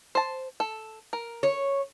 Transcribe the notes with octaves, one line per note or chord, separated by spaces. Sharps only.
C5 A5
A4
A#4
C#5